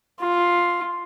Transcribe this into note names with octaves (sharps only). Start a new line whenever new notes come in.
F4